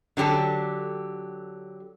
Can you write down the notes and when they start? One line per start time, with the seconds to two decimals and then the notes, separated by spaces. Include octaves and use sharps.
0.17 D3 F#3 G4 A4